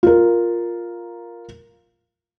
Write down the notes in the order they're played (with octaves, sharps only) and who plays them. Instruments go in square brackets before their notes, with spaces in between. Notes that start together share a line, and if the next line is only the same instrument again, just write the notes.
[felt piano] F4 A#4